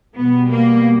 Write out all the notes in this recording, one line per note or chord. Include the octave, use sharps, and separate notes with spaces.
B2 G3 B3
A#3